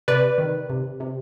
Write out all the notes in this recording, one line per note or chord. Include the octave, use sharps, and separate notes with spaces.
C3 B4 D5
D#3
C3
C3